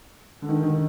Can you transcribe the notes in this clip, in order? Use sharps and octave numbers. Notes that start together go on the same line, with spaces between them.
D3
D#3
D#3